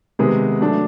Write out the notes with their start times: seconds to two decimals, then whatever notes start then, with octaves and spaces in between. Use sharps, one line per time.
0.19 C3 D#3 G#3 B3 D#4
0.60 F#3 A3 D4